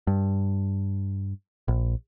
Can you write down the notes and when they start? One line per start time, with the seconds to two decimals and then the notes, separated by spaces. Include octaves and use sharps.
0.07 G2
1.68 A#1